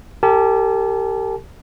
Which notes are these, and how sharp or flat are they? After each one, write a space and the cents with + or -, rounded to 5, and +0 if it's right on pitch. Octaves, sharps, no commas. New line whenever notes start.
G4 +0 A#4 -45 A5 -45